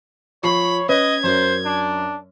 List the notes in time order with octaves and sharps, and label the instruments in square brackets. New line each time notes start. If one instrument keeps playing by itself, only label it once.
[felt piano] F3 C#6 C7 [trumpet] C#5 [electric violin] B5
[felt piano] C#4 B4 C#5 [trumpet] D#5 [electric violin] G#6
[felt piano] F#2 C#4 A#4 [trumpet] C5
[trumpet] D4